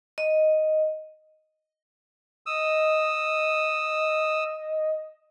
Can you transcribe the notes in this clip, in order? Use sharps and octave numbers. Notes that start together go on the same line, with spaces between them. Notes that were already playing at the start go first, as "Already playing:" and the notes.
D#5
D#5 D#6 E6